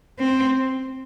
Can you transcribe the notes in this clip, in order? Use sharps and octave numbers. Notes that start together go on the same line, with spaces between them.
C4